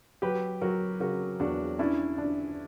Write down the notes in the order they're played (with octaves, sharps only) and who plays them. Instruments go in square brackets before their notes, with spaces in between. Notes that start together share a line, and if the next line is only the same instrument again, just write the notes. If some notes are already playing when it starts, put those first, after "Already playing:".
[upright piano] F#3 [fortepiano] G4 B4
[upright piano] F#3 [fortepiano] F#4 A#4
[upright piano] C#3 [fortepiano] F#4 A#4
[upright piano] E2 [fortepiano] D4 F#4
[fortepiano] C#4 E4 [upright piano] D4
[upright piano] D4